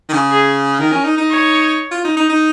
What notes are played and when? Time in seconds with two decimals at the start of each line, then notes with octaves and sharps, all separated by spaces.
0.09 D#3
0.14 C#3
0.31 G#4
0.80 D#3 A#4
0.92 C#4
1.04 D#4
1.17 D#4
1.30 C#5
1.92 F4
2.05 D#4
2.16 D#4
2.29 D#4